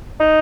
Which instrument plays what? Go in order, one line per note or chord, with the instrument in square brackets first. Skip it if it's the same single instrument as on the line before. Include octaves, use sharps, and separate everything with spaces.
[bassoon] D#4